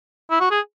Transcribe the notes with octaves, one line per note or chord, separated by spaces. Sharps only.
E4
F#4
G#4